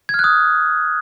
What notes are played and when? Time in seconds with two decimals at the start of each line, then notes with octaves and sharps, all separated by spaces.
0.09 G#6
0.14 F6
0.19 F#6
0.24 D#6